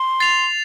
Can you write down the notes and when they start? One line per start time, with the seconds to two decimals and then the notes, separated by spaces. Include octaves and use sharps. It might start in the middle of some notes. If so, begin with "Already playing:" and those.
Already playing: C6
0.20 A6 C7 F7